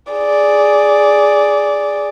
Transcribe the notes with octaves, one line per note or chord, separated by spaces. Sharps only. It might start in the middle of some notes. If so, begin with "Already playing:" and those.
G#4 D5